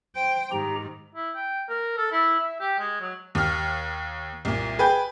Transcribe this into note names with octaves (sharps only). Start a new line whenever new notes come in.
C5 G5
G#2 D#3 D#4 G4 A#5
E4
G5
A#4
A4
E4
E5
G4
G#3
F#3
D#2 F6
C2 A#2
G#4 B4 G5 G6